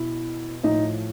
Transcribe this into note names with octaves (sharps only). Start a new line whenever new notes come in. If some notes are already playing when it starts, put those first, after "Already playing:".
Already playing: B2 E4
A2 F3 D#4